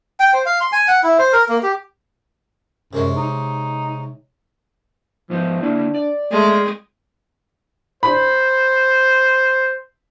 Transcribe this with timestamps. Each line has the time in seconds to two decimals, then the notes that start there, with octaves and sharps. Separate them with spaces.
0.20 G5
0.33 C5
0.46 F5
0.61 C6
0.73 G#5
0.88 F#5
1.03 E4
1.19 C5
1.33 A#4
1.49 A#3
1.63 G4
2.93 F#2 C3 G#3 C#4
3.16 D#4
5.30 G#2 F3 B3 D#4
5.63 D3 A#3 D4 E4
5.95 D5
6.31 G#3 A3 G#4 D5
8.03 C5 B5